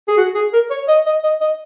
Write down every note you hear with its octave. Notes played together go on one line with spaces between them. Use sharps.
G#4
F#4
G#4
A#4
C#5
D#5
D#5
D#5
D#5